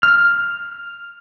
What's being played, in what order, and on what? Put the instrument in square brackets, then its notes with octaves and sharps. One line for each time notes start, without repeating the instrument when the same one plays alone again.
[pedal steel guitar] F6